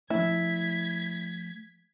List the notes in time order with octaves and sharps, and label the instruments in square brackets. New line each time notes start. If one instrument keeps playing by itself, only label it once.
[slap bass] F3 A3 [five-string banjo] E4 [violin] G#6 B6